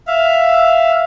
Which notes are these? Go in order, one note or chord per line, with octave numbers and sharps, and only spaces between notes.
E5 F5